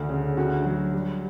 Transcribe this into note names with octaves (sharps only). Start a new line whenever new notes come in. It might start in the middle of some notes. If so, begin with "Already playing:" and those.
Already playing: D2 D3
C#3
D2 F#4
F#3
G3